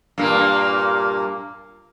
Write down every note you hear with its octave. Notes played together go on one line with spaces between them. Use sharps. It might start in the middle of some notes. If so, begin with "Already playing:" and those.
G2 A#2 A#3